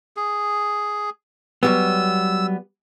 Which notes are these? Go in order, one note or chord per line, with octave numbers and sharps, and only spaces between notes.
G#4
F#3 G3 B3 E6